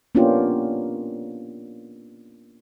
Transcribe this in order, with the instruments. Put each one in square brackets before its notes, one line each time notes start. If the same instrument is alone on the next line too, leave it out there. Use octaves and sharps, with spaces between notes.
[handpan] A#3 B3 C#4 D4 F4 G4